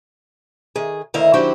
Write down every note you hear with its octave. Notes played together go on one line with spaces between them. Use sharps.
D#3 G#4
D2 D#3 E4 D#5 F5
D#3 F#3 D4 E4 G4 C5